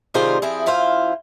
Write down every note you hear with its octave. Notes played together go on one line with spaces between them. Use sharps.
C3 D#3 G3 F4 G#4 C5
F3 C4 E4 G#4
F#2 E4 F4 C5 F5